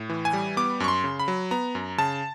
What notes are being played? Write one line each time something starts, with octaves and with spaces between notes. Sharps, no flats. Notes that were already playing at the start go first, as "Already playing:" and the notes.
Already playing: A2
E3
G#5
G3
B3 D6
F#2 C#6
C6
C#3
B5
F#3
B3 A#5
F#2
C#3 A5